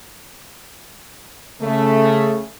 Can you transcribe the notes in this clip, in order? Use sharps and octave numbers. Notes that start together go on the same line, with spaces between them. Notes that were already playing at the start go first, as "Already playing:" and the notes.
C#3 A3